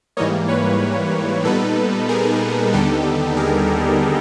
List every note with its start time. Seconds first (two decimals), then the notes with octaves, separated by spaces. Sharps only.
0.17 G#2 E3 G3 A#3 C#5 D#5
0.48 B4 C#5
1.45 A#2 G3 B3 D#4 A4 B4
2.09 G#4 A#4
2.73 D#2 D3 G3 B3 D#4 G4 A4
3.37 G#4 A#4